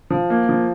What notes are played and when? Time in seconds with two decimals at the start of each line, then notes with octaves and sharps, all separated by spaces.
0.10 F3
0.30 A#3
0.49 F3